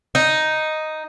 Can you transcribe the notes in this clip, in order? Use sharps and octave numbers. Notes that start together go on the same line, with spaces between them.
D#4